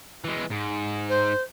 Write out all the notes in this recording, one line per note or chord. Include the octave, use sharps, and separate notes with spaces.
E3 G#3
G#2
C5